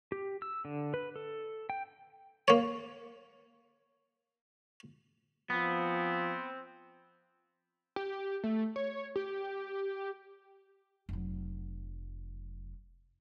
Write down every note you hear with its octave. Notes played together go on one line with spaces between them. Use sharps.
G4
E6
D3
B4
A4
G5
A#3 C#5
F3 B3 C4
G4
A3
C#5
G4
F1 F#3